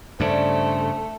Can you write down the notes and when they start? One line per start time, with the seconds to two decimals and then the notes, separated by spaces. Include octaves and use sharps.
0.20 G2 C#3 A3 D4 C5